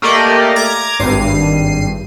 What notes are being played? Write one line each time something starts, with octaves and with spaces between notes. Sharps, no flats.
A3 A#3 G4 A#4 D5 D#5
A#5 D6 G#6
G#1 G2 C7 D#7